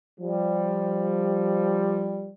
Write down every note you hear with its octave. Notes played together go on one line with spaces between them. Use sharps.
F3 G3